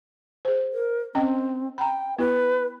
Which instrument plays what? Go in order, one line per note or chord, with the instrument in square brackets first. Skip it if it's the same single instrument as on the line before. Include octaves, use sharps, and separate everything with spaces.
[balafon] G#4 C5
[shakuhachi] A#4
[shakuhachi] C4 [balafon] C#4 D#5 G5
[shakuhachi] G5 [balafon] A#5 B5
[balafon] B3 E4 G4 [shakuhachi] B4